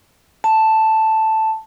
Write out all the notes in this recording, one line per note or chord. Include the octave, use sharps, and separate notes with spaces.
A5